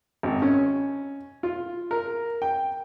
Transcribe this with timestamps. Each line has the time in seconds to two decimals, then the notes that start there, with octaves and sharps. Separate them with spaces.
0.23 G#1
0.42 C#4
1.43 F4
1.91 A#4
2.42 G5